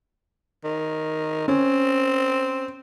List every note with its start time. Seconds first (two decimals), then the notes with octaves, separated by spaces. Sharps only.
0.64 D#3
1.48 C4 C#4